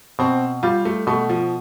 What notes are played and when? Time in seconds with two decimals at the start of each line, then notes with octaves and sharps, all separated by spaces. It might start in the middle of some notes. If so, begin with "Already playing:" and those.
0.19 B2 C4
0.63 G3 F4
0.85 A3
1.07 B2 A3
1.29 F3